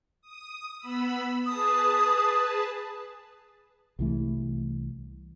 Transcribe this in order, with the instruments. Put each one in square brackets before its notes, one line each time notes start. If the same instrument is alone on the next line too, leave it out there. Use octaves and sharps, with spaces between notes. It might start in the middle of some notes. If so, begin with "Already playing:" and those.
[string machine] D#6
B3 B5 E6
[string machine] G#4 B4 A5 [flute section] D#6
[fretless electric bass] C2 E3 A3